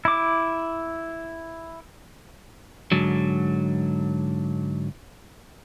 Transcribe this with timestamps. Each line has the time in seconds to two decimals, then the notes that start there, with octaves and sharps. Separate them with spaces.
0.05 E4 D6
2.92 G#2 D3 F#3